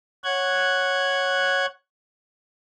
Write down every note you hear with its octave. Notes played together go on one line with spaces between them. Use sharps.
C#5 F#5 F#6 G#6